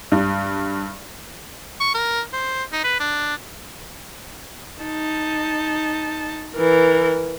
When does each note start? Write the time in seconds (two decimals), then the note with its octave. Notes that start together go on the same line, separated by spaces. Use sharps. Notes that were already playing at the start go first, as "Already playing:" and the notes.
0.12 G2
1.80 C#6
1.94 A#4
2.33 C5
2.72 D#4
2.84 B4
3.00 D4
4.81 D#4 A5
6.54 E3 A#4